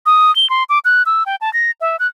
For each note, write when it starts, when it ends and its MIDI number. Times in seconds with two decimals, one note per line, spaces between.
0.06 0.34 87
0.36 0.49 103
0.50 0.64 84
0.69 0.79 86
0.85 1.03 90
1.06 1.23 88
1.26 1.36 79
1.41 1.52 81
1.53 1.71 94
1.81 1.97 76
1.99 2.07 90